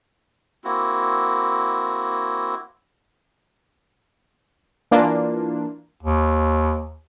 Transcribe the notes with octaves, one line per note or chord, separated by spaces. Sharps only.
A#3 C4 E4 F#4
E3 A#3 D4 F4
D#2